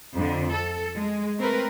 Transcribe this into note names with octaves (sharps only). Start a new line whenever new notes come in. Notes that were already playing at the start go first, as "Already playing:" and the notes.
F2 D3
A4
G#3
A3 C4 A#4 B4